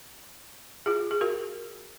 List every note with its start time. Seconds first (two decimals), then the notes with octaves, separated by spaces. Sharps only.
0.86 F4 G#4
1.11 G#4
1.21 F#4 A#4